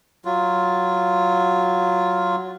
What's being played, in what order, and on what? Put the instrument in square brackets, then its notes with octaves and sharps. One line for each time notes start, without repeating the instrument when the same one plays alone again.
[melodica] F#3 F4